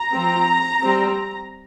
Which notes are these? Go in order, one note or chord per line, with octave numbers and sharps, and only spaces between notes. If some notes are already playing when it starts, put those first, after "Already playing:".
Already playing: A#5
F3 C4
G3 C4